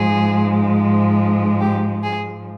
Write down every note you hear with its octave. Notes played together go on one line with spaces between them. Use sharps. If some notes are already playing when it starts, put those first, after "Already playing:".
Already playing: G#2 F3 G#3 G#4
G4
G#4